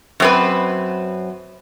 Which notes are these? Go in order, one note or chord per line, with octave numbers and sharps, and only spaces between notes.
F#2 C4 B4